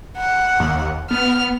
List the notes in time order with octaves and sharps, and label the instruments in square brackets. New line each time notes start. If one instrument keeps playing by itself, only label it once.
[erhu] F#5
[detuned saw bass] D#2
[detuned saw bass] B3 [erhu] F6